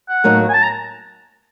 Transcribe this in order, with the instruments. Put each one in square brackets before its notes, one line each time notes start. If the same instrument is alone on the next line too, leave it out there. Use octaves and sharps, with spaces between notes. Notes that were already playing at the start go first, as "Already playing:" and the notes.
[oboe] F#5
[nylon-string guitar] A2 F#3 A#3 D#4
[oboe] G#5
A5
A#5